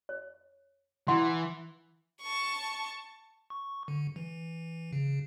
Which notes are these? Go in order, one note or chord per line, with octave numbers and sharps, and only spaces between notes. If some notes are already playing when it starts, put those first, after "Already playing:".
C#5
E3 E4 F#5 C6
A5 C#6
C#6
D3
E3
C#3